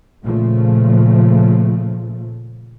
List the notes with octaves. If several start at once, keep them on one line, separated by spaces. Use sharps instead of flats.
A#2 C#3 F3 A3